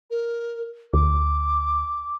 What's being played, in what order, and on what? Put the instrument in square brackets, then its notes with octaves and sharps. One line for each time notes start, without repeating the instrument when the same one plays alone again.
[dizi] A#4
[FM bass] D2 [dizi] D6